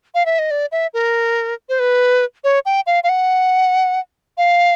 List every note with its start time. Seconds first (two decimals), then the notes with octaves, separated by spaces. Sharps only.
0.14 F5
0.26 E5
0.39 D#5
0.51 D5
0.72 E5
0.94 A#4
1.69 C5
1.79 B4
2.44 C#5
2.65 G5
2.87 F5
3.03 F5
3.09 F#5
4.38 F5